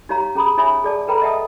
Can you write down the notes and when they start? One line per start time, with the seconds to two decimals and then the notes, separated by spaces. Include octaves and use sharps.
0.09 D#4 G4 C#5 F5 A#5
0.35 C#4 G#4 A#5 B5 D#6
0.58 D#4 C#5 E5 G#5 B5 D#6
0.84 G#4 D5 A5
1.07 A4 B4 G5 A#5 B5
1.22 D#5 E5 F#5 G5 A5 D#6